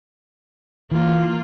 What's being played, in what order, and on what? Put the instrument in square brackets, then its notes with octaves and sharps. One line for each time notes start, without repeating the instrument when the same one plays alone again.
[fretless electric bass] E3 [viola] A#3 F4